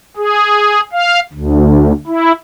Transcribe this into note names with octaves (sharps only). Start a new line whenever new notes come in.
G#4
F5
D2
E4